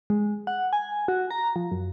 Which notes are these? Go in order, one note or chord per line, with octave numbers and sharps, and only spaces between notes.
G#3
F#5
G#5
F#4
A#5
F3
F#2